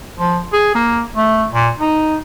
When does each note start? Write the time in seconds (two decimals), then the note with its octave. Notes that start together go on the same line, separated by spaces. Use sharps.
0.18 F3
0.53 G#4
0.75 A#3
1.16 A3
1.52 A#2
1.79 D#4